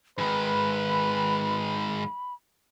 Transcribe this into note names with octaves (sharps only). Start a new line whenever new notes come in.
G#2 D#3 B4 B5